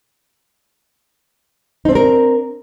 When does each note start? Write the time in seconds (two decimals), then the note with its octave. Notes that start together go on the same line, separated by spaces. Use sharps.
1.85 D#4
1.89 C4
1.92 D4
1.95 A#4